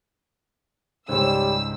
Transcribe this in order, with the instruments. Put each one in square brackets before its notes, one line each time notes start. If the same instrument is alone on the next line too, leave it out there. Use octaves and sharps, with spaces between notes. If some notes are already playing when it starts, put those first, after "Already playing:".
[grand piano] C#2 G#2 [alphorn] G3 [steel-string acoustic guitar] C5 C#5 [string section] E6